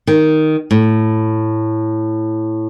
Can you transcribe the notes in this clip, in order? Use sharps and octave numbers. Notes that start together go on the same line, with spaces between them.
D#3
A2